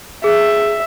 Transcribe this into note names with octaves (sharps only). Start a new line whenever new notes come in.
G#4 E5